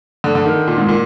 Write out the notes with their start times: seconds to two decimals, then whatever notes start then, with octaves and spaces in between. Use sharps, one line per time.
0.24 D3
0.35 D3
0.46 D#3
0.67 A#2
0.78 G#2
0.89 A#2